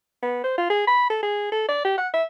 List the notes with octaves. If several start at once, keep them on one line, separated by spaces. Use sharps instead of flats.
B3
C5
F4
G#4
B5
A4
G#4
A4
D5
G4
F#5
E5